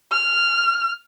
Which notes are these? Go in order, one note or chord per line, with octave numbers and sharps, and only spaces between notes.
F6